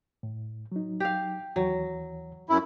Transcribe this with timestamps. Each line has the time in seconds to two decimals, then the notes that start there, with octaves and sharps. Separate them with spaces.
0.23 A2
0.72 F#3 D#4
1.00 G4 F5
1.56 D#2 E3 F#3 C#5
2.50 F#2 E4